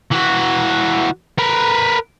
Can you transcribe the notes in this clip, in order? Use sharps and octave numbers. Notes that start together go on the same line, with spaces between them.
E3 F#4
A#4 B4